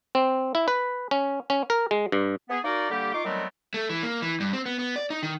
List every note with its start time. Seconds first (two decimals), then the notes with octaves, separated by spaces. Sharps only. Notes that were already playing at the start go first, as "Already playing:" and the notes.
0.15 C4
0.55 E4
0.68 B4
1.11 C#4
1.50 C#4
1.70 A#4
1.91 G#3
2.12 G2
2.49 B3 G#4
2.64 A#3 D#4 F#4 A#4 D5
2.90 D3 G3 A#3 G4
3.13 D#4 F4 C#6 D6
3.25 D#3 F#3 G3 A3 B3 C4
3.74 A3
3.89 E3
4.03 A#3
4.22 E3
4.40 G2
4.53 C4
4.66 B3
4.79 B3
4.96 D5
5.10 D#4
5.23 D#3